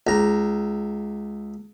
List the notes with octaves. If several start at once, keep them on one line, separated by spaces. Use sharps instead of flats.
C#2 A#5